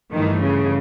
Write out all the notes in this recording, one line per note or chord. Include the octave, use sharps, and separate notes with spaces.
G2 D#3 E3 A3
C#3